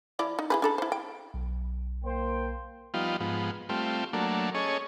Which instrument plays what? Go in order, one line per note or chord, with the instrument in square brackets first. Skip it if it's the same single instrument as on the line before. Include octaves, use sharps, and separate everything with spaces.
[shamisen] F3 E4 D5
D#4
E4 G#4 B4
D4 A4 B5
E4 C5
G5
[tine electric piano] B1
[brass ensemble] A#3 C5 G5
[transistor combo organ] F3 G3 B3 D#4 F4
G#2 F3 B3
G3 A3 C4 F4
F#3 A3 A#3 D4
C#4 G#4 A4 C#5 D#5